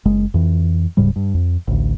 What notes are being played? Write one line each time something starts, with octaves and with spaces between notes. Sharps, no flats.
F#1 G#3
F2 E3
D1 G#2 C#3 G3
G2
F2
A1 D2